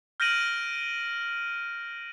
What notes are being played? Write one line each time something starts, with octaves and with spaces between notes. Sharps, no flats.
F6 G6 A#6 D7 D#7 F#7